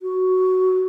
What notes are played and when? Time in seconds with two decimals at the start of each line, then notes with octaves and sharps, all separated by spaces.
0.02 F#4